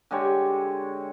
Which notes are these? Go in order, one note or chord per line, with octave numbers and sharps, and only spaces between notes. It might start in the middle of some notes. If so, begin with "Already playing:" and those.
D3 G#3 G4 C#5